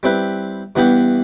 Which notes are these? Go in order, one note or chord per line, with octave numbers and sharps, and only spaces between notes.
G3 C4 E4 G4 B4
G2 E3 B3 E4 G4